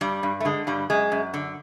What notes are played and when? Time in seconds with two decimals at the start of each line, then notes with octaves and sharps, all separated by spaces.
0.01 G2 G3
0.23 G2
0.40 A3
0.45 D3 G#3
0.67 G2 G3
0.90 F#2 G#3
1.12 F#2
1.34 D3